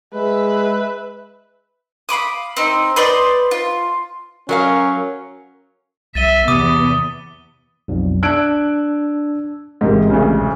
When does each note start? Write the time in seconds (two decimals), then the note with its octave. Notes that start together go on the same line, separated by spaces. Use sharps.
0.14 G#3 B4 E5
2.09 F5 B5 D6 D#6
2.57 C4 D#4
2.96 B4 C5 D5 D#5
3.51 F4
4.49 F#3 C#4 A#4 F5
6.15 C2 E5 A6 D#7 G7
6.48 E2 C3 B3 D6 D#6 D#7
7.88 B1 F2
8.23 D4 E6 F#6 G#6 D7
9.81 A1 G#2 C3 G#3 A#3
10.10 D2 C#3